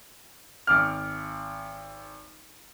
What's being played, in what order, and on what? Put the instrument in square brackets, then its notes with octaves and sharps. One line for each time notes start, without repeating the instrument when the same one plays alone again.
[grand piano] G#1 D6 F6